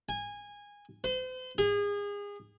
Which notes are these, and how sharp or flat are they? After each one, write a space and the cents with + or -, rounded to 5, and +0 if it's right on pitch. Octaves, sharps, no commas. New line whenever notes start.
G#5 -20
C5 -40
G#4 -30